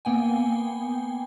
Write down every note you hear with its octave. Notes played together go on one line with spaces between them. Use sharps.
A#3 B3 G5 G#5